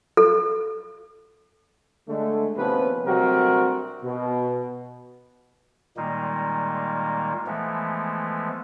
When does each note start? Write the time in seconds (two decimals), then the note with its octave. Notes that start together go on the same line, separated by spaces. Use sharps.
0.17 A4
2.09 D3 G#3 A3
2.57 D#2 C3 F3 B3 C#4 B4
3.06 D2 C3 F#3 G3 F#4 A#4
4.04 B2
5.97 A#2 D#3 G3 G#3 A#3 D#4
7.46 E3 F3 G#3 A3 B3